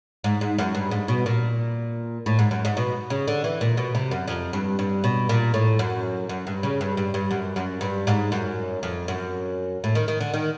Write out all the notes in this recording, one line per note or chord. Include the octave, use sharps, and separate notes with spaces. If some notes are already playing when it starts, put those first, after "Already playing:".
G#2
G#2
F#2
G2
G#2
B2
A#2
A2
G#2
F#2
G#2
B2
C#3
D3
E3
A#2
B2
C3
F#2
F2
G2
G2
B2
A#2
A2
F#2
F#2
G2
C#3
G2
G2
G2
F#2
F#2
G2
G#2
F#2
F2
F#2
A2
D#3
D#3
D3
D#3